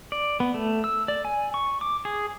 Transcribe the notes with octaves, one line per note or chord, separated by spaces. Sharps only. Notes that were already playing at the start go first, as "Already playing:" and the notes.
D5
B3
A3
E6
D5
G#5
C#6
D6
G#4